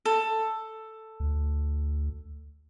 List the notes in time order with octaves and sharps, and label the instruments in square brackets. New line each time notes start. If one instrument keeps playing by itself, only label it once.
[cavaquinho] A4
[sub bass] D2